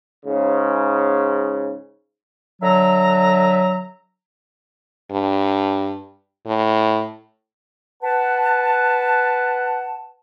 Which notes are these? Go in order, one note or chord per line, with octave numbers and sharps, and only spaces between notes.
G#2 C#3
D3 F#3 E5 A#5
G2
A2
B4 F#5 A5